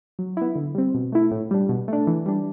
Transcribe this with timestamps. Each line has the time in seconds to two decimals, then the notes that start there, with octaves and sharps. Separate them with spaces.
0.19 F#3
0.37 B3 E4
0.55 D3
0.75 G3 C4
0.94 B2
1.12 A3 E4
1.31 A2
1.51 G3 D4
1.69 B2
1.88 A3 D4
2.07 E3
2.26 G3 D4